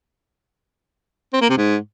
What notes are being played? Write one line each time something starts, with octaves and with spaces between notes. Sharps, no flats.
C4
A#3
C3
G#2